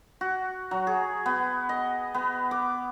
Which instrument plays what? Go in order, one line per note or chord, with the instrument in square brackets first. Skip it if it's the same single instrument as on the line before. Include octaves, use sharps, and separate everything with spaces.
[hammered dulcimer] F#4
F#3
G#4
B3
D#5
B3
D6